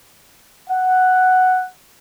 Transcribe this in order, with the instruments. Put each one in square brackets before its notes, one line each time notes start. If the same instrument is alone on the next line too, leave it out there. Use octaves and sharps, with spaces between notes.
[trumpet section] F#5